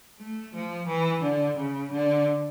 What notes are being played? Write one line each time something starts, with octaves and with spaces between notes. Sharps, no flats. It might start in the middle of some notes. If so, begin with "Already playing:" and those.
A3
F3
E3
D3
C#3
D3